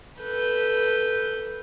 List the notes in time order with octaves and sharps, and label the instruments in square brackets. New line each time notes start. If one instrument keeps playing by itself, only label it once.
[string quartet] A4 B4 G6